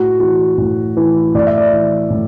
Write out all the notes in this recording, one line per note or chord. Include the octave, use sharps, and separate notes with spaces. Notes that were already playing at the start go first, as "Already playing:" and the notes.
Already playing: A2 F#4
E3 F#4
A2
E3
A2 D5
E5
D5
E3
A2